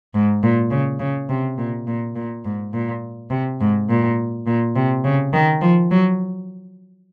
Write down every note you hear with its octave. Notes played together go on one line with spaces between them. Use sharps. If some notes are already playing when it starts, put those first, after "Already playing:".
G#2
A#2
C#3
C#3
C3
A#2
A#2
A#2
G#2
A#2
C3
G#2
A#2
A#2
C3
C#3
D#3
F3
F#3